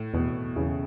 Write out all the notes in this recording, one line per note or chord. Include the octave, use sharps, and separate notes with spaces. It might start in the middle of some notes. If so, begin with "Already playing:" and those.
Already playing: A2
E2 B2
E2 C#3